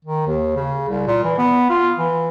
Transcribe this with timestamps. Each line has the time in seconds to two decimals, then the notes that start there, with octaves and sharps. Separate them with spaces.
0.05 D#3
0.27 D#2
0.56 C#3
0.89 C2
1.07 A#2
1.24 E3
1.38 B3
1.70 F4
1.97 E3